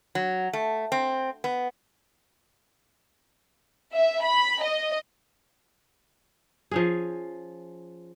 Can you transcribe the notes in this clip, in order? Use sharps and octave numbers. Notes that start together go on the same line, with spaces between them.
F#3
A3
C4
B3
E5
B5
D#5
F3 C#4 G#4